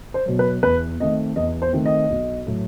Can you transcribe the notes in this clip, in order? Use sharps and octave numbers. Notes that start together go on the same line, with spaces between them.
C5
B2 F#3
B4
E2 B4
D#3 A3 C4 D#5
E2 D#5
C5
D#3 A3 C4
D#5
B1
A2 F#3 A3